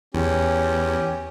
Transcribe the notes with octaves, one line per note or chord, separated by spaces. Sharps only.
E2 C#4 G4